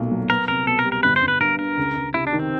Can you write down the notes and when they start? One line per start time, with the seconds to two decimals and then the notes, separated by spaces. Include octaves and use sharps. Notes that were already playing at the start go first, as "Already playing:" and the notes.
Already playing: B1 A#2 A3
0.12 F#3
0.29 B3 A#4
0.48 C2 A#4
0.67 B2 A4
0.79 A#4
0.85 G3
0.92 A#4
1.03 G1 B4
1.16 C5
1.22 G1
1.28 B4
1.40 G2 A#4
1.59 D3 A#4
1.77 C#2
1.96 C#2
2.14 C3 E4
2.27 D4
2.33 D#3
2.39 C4